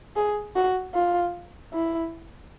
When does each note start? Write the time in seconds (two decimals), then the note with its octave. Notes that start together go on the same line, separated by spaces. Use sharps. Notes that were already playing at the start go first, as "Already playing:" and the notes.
0.16 G#4
0.56 F#4
0.94 F4
1.74 E4